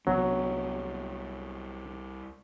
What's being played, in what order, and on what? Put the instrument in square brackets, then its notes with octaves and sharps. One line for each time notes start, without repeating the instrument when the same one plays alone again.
[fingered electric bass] C2 B3 D4 [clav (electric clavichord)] F#3